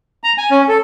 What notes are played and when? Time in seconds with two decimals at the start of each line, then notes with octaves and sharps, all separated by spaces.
0.24 A#5
0.38 G#5
0.51 C#4
0.68 A4